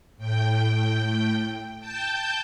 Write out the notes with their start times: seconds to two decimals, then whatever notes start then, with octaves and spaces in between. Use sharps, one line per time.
0.17 A2 G5
1.80 G5 A5 G6